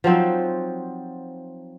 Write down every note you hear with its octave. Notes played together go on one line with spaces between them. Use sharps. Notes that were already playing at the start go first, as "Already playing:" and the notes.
F3 F#3 C4 D#4